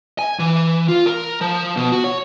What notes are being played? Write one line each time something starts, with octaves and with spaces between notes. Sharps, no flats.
G#5
E3
F4
A#4
F3
B2
F#4
C#5